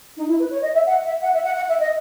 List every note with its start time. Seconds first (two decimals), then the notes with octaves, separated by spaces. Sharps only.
0.17 D#4
0.28 E4
0.39 B4
0.51 C#5
0.62 D#5
0.74 E5
0.86 F#5
1.04 E5
1.22 F#5
1.33 E5
1.44 F#5
1.56 F#5
1.68 E5
1.80 D#5